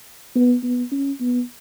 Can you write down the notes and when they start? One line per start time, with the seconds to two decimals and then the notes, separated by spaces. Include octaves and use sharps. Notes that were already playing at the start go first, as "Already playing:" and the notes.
0.36 B3
0.63 B3
0.92 C#4
1.20 B3